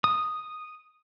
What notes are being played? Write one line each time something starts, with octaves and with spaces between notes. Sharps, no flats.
D#6